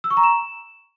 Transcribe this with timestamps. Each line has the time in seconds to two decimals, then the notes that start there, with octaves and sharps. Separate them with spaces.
0.04 E6
0.10 C#6
0.17 A#5
0.23 E7